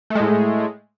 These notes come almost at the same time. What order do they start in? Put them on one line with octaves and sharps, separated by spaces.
A3 G#3 A2